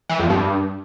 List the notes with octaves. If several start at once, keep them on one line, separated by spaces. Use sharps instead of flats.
E3
F2
G2